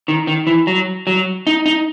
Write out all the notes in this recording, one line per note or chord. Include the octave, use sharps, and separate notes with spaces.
D#3
D#3
E3
F#3
F#3
D#4
D#4